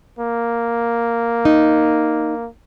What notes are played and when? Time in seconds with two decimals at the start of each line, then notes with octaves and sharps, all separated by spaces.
0.19 A#3
1.45 D#4